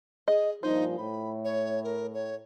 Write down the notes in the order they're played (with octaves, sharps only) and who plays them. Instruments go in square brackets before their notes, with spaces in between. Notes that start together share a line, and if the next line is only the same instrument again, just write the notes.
[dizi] G#4 [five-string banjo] D#5
[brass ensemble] G2 A#2 F3 [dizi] D#4 [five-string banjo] C5
[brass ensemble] A2 [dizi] B5
[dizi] C#5
A#4
C#5